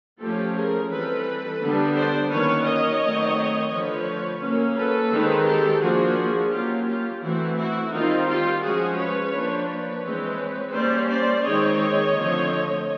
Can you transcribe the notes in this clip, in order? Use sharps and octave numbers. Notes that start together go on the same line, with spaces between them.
F3 A3 C#4 G4 A4
G#4 A#4
E3 G3 C4 A4 B4
D3 G3 B3 D4
C5 D5
D#3 F#3 A#3 C#4 B4 C#5
C#5 D#5
D#3 F#3 A3 C4
D3 F3 A3 B4 C#5
F#3 A#3 C#4
A4 B4
D#3 G#3 C4
G4 A4
F3 A#3 D4 F#4 G#4
F#3 A#3 C#4 F4 G4
F4 G4
E3 A3 C4 E4 F#4
E4 F#4
D#3 G3 C4 D#4 F4
F4 G4
F3 G#3 C#4 F#4 G#4
B4 C#5
F3 A#3 D4
B4 C#5
E3 G#3 C4
G3 A#3 C#4 C5 D5
C5 D5
D#3 G#3 C4 C#5 D#5
D3 F3 A3 C4